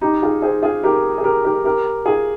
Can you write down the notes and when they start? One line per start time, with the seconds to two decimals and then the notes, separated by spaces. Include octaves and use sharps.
0.01 D#4 G4
0.22 F4 G#4
0.42 G#4 C5
0.63 F4 G#4
0.83 G4 A#4
1.18 G#4
1.24 G4 A#4
1.45 G4 A#4
1.64 G4 A#4
2.06 F4 G#4